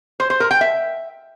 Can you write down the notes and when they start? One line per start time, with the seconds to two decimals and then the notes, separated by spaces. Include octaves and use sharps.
0.20 C5
0.30 C5
0.40 A#4
0.51 G5
0.61 E5